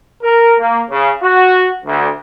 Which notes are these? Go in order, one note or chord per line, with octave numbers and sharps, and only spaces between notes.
A#4
A#3
C#3
F#4
D2